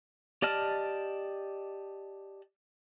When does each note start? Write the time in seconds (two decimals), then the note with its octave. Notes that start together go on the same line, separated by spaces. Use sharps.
0.42 G4 D5 D#5 A5 F6